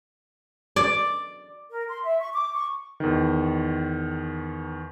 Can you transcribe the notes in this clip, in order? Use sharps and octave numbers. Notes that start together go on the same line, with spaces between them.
D5
A#4
C6
E5
C#6
D6
C#6
E2 D#3